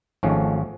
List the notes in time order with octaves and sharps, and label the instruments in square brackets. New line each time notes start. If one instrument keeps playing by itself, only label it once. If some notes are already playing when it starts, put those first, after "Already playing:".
[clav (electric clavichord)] G#1 G#2 F3 A3 C#4